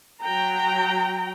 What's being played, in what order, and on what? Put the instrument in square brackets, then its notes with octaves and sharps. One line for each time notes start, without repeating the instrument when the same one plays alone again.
[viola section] F#3 G5 A#5